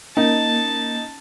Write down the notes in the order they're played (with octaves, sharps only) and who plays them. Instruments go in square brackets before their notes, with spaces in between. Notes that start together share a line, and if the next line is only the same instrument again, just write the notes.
[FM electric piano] A#3 [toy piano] C#4 [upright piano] D#4 [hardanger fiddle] A5